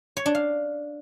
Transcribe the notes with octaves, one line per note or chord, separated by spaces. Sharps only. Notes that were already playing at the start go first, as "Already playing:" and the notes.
C#5
D4
F5